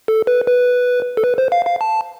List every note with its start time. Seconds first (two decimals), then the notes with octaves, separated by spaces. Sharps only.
0.08 A4
0.27 B4
0.47 B4
1.17 A4
1.24 B4
1.38 C5
1.52 F5
1.66 F5
1.81 A5